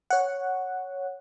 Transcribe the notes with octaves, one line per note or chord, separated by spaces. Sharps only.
C#5 F#5